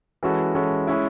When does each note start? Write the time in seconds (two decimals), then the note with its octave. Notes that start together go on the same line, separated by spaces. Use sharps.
0.23 E3 G#3 C#4 F#4 A4
0.55 E3 G#3 C#4 F#4 A4
0.87 G#3 C#4 E4